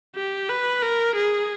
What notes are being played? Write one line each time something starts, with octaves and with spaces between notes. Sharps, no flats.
G4
B4
A#4
G#4